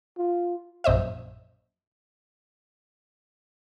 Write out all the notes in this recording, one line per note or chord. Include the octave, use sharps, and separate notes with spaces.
F4
A#1 F#2 C5 D#5 E5